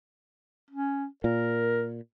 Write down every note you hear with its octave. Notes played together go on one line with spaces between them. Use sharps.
C#4
A#2 A#4